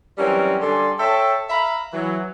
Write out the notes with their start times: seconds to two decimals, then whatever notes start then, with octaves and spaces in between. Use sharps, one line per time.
0.18 E3 F#3 G3 C4 C#4 A#4
0.61 D3 G3 A4 D5 G#5 C6
0.98 A4 C#5 E5 G5 A5
1.49 E5 F5 A#5 B5
1.93 E3 F#3